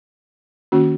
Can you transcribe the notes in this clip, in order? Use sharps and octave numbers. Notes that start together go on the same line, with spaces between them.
D#3 A#3 C#4 F#4